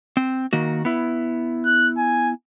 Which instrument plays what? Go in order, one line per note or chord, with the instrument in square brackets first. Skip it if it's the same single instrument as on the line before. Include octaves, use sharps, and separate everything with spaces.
[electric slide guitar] C4
D#3 A#3 F#4
B3 E4
[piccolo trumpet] F#6
G#5